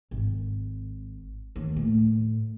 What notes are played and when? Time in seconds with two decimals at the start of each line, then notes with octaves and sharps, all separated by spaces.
0.11 G#1
1.56 D#2
1.76 A2